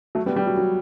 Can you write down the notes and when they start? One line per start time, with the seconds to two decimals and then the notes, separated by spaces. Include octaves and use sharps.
0.15 F#3 A3
0.26 G3 B3
0.36 G3
0.47 F#3
0.57 F#3